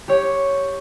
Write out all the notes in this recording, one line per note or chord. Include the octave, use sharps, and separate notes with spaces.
G4 C#5